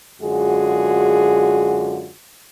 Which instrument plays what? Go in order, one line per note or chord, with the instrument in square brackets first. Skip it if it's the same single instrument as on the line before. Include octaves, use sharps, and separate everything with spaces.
[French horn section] F#2 D3 G#3 F4 F#4 G#4